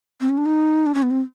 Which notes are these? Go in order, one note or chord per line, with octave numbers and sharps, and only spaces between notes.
C4
C#4
D4
D#4
D4
C#4
B3
C4